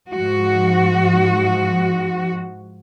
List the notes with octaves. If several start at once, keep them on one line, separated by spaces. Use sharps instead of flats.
G#2 F3 F#4